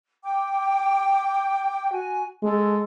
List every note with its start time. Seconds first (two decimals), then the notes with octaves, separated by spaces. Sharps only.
0.23 G5 D6
1.91 F#4 G#5
2.43 G#3 A4